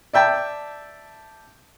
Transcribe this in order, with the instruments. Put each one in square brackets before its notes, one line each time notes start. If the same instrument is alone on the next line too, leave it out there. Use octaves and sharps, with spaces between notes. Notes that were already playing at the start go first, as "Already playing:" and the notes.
[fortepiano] D5 E5 G5 A5